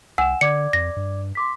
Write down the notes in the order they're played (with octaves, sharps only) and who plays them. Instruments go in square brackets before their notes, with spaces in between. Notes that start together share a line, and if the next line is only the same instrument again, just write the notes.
[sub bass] C2 [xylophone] F#5 E6 [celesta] G#5 E7
[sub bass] D3 [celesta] D5 D6 G#6 [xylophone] C#7
[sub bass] F2 [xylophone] A#6
[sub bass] G2
[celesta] C6 D6 B6